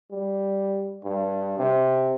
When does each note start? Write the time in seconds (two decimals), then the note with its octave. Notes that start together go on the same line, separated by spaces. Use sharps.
0.12 G3
1.04 G2
1.59 C3